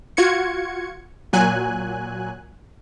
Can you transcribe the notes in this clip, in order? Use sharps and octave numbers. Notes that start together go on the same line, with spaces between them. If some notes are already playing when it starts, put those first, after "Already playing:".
F4 F#4 G#6 C#7
A#2 F#3 G#5 F#6